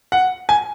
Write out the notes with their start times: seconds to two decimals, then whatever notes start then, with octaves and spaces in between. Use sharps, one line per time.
0.12 F#5
0.49 G#5